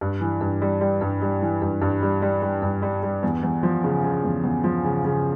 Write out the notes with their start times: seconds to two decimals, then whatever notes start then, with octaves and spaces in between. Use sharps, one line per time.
0.01 G2
0.21 E3
0.41 G2
0.61 G3
0.81 G3
1.01 G2
1.22 G3
1.42 E3
1.62 G2
1.82 G2
2.02 G3
2.22 G3
2.42 G3
2.62 G2
2.82 G3
3.03 G3
3.23 E2
3.43 E2
3.63 F3
3.84 C#3
4.04 C#3
4.24 E2
4.44 E2
4.64 F3
4.84 C#3
5.04 C#3